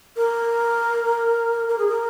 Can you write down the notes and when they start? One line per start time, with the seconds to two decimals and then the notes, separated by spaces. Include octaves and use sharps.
0.16 A#4
1.69 A#4
1.78 G#4
1.88 A#4